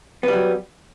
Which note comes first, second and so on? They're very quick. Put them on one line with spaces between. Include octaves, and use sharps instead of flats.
B3 G3 F#3